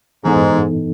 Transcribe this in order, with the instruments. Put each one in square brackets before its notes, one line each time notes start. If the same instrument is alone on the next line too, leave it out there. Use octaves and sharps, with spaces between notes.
[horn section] G#2 [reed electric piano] E3 B3 D#4 A4